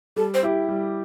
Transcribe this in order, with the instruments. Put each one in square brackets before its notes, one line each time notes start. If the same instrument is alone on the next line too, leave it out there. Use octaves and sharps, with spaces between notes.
[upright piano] G3 [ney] A4
[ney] C5
[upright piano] E4 G4
G3